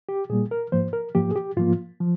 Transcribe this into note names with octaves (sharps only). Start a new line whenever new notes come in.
G4
A#2 G3 A#3 G#4
A#4
G#2 F3 A#3 C5
A#4
G#2 F3 A#3 G4
G#4
G4
G#2 F3 A#3 F4
F3